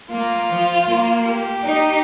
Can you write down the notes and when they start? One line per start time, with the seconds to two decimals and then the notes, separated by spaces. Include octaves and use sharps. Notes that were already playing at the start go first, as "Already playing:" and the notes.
0.11 A#3 F4
0.50 F3
0.88 A#3
1.26 G4
1.64 D#4